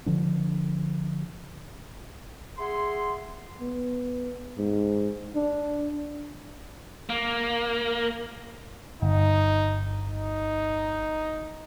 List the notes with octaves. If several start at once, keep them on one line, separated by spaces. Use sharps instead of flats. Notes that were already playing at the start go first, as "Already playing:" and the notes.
D3 F3 D4
G#4 E5 F#5 C6
B3
G#2
D4
A#3
G1 D#4
D#4